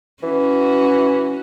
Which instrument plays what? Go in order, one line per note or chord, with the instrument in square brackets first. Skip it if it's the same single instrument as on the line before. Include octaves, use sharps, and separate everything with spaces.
[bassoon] E3 [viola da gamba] C#4 F#4